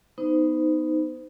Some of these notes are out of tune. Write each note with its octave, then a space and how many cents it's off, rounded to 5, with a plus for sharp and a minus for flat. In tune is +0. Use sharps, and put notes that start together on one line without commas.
B3 +0 D#4 +0 C5 -35